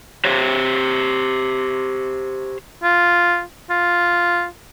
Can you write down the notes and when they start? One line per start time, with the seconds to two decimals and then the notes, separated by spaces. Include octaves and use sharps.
0.25 G4 C5 C#5
2.83 F4
3.70 F4